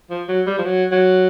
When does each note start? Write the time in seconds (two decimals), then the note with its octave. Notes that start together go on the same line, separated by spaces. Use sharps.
0.10 F3
0.28 F#3
0.47 G3
0.58 F3
0.65 F#3
0.91 F#3